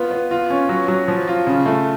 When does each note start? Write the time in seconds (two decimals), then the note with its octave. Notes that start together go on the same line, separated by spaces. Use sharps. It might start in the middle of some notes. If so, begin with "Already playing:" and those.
Already playing: B3 F4
0.11 B3
0.31 F4
0.50 C#4
0.69 F#3
0.88 F#3
1.08 F3
1.28 F4
1.47 C#3
1.66 A3